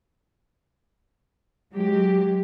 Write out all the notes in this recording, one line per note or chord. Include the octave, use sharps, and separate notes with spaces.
F#3 G#3 G4